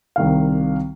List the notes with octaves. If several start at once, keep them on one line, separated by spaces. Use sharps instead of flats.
C2 D#3 F5